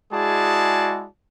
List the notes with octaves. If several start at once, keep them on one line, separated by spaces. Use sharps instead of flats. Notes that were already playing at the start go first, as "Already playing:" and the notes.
G#3 E4 F#4 G#4 D5 A5